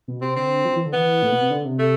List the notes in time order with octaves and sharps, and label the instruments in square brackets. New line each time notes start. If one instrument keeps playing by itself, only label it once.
[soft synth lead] B2
[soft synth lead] C3 [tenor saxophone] C4
[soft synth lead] D3 [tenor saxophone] C4
[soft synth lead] F3
E3
D3
[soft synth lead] E3 [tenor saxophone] B3
[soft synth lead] A2
B2
C3
D3
C3
[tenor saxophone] A3